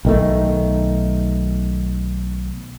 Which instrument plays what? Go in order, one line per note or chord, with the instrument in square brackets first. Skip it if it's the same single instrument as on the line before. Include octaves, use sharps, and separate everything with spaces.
[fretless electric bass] B1 D#3 A3